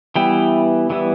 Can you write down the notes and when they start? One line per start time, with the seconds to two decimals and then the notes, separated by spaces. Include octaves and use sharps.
0.16 E3 G3 B3 E4 G5
0.90 E3 G3 B3 E4